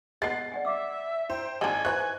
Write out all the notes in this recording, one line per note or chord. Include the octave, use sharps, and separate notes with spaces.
G#3 B3 A6 C7
D5 F#5 G#5
E5 F5 D6 E6
E4 C5 G5
G#1 D4 G#4 D#5 G#5
E3 F4 B4 C5 C#6 F#6